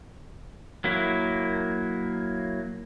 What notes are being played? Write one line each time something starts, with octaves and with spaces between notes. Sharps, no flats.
F#3 A#3 E4